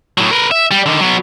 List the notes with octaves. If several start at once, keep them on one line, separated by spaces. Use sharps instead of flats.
A2 F#3
A#4 B4
E5
G3
D3 D#3
F#3 B3